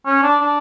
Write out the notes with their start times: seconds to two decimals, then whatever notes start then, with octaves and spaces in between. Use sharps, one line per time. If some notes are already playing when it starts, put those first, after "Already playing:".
0.06 C#4
0.23 D4
0.40 D4